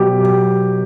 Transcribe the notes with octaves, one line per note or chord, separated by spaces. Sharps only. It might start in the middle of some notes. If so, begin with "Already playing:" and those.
Already playing: B2 F#3 G4